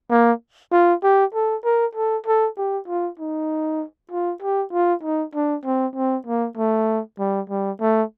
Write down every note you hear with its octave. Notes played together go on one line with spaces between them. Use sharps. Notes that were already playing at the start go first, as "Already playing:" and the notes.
A#3
F4
G4
A4
A#4
A4
A4
G4
F4
D#4
F4
G4
F4
D#4
D4
C4
C4
A#3
A3
G3
G3
A3